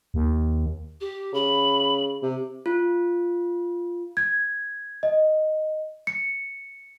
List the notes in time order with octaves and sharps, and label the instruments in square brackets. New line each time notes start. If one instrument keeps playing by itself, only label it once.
[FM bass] D#2
[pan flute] G4
[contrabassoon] C#3 [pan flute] B5
[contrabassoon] C3
[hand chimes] F4
[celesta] G#6
D#5
C#7